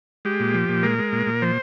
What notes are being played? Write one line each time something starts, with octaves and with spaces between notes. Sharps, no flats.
G#3 G4
A#2
F3
A#2
G#3 A#4
G#3
A#2
A#2
F3 C5